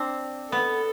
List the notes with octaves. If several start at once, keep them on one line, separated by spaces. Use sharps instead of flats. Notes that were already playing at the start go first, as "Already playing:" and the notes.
Already playing: C4 D4
B3 A4